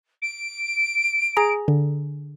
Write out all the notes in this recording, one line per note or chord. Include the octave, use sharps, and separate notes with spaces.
D7
G#4 A#5
D3